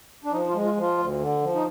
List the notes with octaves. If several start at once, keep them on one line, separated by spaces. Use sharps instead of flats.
D4
F3 D#4
F4
G#3
F4
F3
F4
D2
D3
F3
D#4